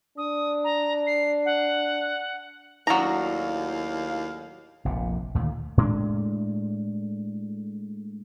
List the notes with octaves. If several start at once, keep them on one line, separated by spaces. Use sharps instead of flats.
D4 D#6
A#5
C7
F#5
D#2 A2 F#3 D4 E4 F#4 F5 A#5
F1 A#1 A#2
D2 A#2 D#3 A3
A2 G#3 C#4 D4